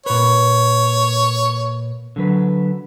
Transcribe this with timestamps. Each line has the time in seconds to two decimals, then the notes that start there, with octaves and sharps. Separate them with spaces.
0.06 A#2 B4 C#5
2.16 D3 F#3 B4